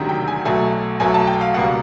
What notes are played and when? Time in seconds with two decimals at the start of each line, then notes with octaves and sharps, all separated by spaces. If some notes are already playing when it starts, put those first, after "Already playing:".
Already playing: E1 D2 C3 D#3 F#3
0.09 G5
0.28 G#5
0.45 B1 B2 F#3 A3 G#5
1.00 B1 B2 F#3 A3 G#5
1.14 A5
1.27 G5
1.41 F5
1.54 C#2 B2 G3 A#3 F#5